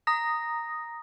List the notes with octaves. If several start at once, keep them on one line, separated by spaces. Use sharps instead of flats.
A#5 D#6 A#6